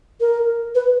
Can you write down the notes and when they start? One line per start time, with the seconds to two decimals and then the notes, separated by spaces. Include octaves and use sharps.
0.20 A#4
0.74 B4